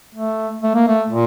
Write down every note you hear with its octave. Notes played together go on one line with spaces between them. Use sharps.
A3
A3
A#3
A3
A#2